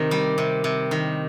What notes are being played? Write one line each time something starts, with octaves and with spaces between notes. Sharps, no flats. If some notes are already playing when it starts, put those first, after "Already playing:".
Already playing: C3 D#3 A#4
G3
C3
C3
D#3